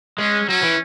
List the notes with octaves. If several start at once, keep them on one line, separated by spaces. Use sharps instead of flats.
G#3 C#4
F#3 C#4
E3